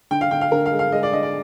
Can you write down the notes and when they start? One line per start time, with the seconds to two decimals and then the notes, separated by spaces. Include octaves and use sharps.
0.11 D3 G5
0.21 F5
0.31 D3 G5
0.41 F5
0.52 D3 A#4
0.66 F5
0.72 G#3
0.79 F5
0.92 G#3 D#5
1.03 D5
1.13 D3 D#5
1.23 D5